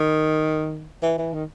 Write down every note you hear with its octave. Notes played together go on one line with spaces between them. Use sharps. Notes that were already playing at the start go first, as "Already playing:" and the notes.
Already playing: D#3
E3
E3
D#3